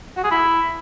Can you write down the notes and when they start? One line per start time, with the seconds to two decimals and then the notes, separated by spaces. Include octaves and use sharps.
0.16 F#4
0.24 G#4
0.31 E4